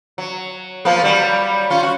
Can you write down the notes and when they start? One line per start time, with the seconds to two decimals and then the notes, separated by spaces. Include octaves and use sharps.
0.18 F#3
0.85 F3 A#3 B3
1.04 F#3 G3
1.70 C#4 F4
1.83 F#4